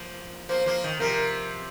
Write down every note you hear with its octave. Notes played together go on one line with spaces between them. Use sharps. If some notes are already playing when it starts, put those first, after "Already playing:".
Already playing: F3 A#3
F3 A#3 C5
F3 A#3
D#3
C3 F3 A#4